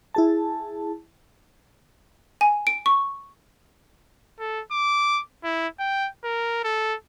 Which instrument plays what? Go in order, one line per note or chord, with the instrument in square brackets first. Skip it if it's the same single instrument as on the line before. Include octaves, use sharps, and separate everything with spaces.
[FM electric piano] E4 G#4 A5
[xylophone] G#5
D7
C#6
[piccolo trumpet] A4
D6
E4
G5
A#4
A4